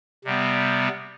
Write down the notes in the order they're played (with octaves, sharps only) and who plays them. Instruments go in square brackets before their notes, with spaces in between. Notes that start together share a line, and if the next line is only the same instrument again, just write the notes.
[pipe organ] C3 G3 B3